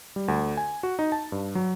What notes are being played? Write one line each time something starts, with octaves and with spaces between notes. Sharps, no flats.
G3
D2
G#5
F#4
D#4
A5
G2
F#3